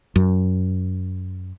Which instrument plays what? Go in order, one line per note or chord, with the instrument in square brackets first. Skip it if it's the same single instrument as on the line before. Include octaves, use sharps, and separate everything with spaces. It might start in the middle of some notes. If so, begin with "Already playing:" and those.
[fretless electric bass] F#2